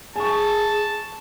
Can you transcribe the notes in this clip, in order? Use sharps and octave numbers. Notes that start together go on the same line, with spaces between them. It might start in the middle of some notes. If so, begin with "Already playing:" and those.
G#4 G#5 A5 C#6